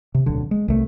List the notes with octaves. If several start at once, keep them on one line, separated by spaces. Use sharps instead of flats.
C3
D1 B1 D3
G#3
C2 A3